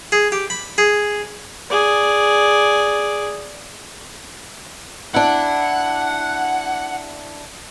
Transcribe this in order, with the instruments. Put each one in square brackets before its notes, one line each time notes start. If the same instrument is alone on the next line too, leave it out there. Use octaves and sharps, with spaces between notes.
[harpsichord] G#4
G4
B5
G#4
[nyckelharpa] G#4 D5
[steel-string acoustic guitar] D4 E4 [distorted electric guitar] F#5